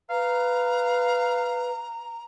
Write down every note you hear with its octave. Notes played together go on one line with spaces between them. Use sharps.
B4 F5 A#5